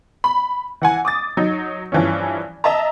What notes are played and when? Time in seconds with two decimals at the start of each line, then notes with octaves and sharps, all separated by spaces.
0.24 B5
0.82 E3 F#5 G#5
1.05 D6 D#6 A6
1.37 F#3 D#4
1.92 G2 E3 F3 C#4
2.64 D#5 E5 A5 A#5